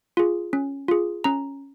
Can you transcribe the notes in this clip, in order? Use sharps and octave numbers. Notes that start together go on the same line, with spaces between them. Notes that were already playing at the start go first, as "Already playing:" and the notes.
F4 G#4
C#4
F4 G#4
C#4 A#5